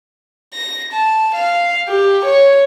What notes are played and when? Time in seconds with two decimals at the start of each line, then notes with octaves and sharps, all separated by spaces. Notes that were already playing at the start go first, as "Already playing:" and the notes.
0.54 A#6
0.93 A5
1.35 F5
1.88 G4
2.25 C#5